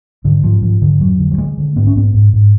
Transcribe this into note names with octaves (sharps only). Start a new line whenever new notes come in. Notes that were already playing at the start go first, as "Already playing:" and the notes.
G#2 D3
G#2 F3
G#2 F3
G#2 D3
F2 F#3
D3
F#3
D3 G#3
D3
G#2 B3
C#4
G#2 B3
G#2
G#2